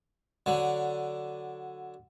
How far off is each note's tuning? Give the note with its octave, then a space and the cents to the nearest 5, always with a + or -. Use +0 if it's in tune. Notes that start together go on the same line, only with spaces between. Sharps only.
D3 +0 F#3 +0